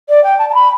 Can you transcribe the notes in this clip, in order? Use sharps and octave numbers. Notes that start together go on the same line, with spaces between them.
D5
G5
A5
A5
B5